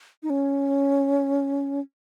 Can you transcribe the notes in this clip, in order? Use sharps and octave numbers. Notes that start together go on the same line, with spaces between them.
D#4
C#4